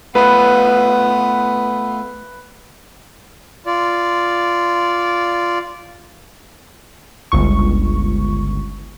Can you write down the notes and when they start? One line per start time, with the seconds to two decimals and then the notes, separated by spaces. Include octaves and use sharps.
0.15 A3 B3 F4 B4
3.66 F4 D5
7.32 G1 C#2 C#6